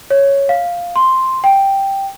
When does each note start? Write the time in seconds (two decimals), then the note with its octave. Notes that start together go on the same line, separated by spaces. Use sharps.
0.10 C#5
0.49 F5
0.96 C6
1.44 G5